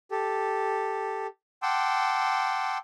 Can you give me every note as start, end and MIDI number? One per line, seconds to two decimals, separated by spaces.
0.11 1.27 67
0.11 1.27 69
1.62 2.78 78
1.62 2.78 79
1.62 2.78 81
1.62 2.78 84
1.62 2.78 86
1.62 2.78 88